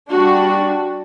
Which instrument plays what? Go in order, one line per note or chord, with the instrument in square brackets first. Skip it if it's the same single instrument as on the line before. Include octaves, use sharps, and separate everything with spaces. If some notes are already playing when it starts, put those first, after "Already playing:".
[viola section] G3 D4 F#4